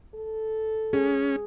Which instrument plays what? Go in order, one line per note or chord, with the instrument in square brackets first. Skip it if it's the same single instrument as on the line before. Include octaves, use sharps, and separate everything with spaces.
[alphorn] A4
[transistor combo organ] C#4 [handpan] G#4